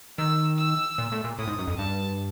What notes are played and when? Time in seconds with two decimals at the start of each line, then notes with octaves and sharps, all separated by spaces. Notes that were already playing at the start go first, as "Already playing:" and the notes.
0.18 D#3 E6
0.58 E6
0.98 A#2
1.12 A2
1.24 A#2
1.38 A2 D#6
1.47 G#2
1.59 F#2
1.68 F2
1.78 G2 A5